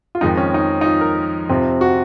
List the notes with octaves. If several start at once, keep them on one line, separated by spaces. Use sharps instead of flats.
F4
F2 D#3 G#3 D#4
C#4
D#4
D#4
F4
A#4
F2 C3 F3 C4
F#4